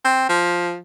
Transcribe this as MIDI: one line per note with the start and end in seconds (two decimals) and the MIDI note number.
0.04 0.28 60
0.29 0.77 53